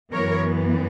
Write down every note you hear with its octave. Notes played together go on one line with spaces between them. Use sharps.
F#2 E3 B3 A#4 C#5